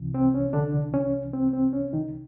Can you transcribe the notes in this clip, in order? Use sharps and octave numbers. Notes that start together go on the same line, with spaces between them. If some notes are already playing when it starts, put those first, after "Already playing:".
Already playing: C2 C3 E3
C4
C#4
D3 D4
C#4
C4
C4
C#4
D#3 D#4